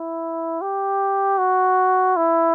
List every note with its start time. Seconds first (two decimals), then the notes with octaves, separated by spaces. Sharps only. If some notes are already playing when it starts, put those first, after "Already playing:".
Already playing: E4
0.61 G4
1.38 F#4
2.17 E4